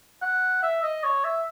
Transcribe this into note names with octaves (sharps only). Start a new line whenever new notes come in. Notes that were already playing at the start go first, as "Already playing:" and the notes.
F#5
E5
D#5
C#5
E5